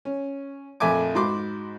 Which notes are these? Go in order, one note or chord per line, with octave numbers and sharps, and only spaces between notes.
C#4
A#1 F2 A3 E5 G#5 D6
G#2 F#4 B5 C6 D6